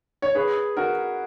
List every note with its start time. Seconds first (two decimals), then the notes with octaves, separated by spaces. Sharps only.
0.22 C#5
0.35 G#4 B4
0.77 F#4 A#4